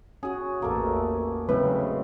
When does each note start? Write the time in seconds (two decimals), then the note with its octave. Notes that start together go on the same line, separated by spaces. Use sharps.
0.23 C#4 F#4 G#4
0.62 A1 E2 A#3 F#4 A4
1.49 A2 C#3 F#3 G#3 C4 B4